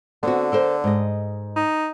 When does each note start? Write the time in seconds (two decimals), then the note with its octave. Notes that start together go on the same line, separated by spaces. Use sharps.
0.23 D3 B3 C4 F#4
0.52 A4 A#4 C5
0.84 G#2 D#5
1.56 D#4